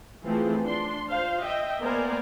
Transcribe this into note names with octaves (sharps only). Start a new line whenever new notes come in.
E3 F3 A3 C4 G#4
D4 C6
F4 C5 F5
D#5 E5 G5
A#3 B3 A#4 C5 D5 G#5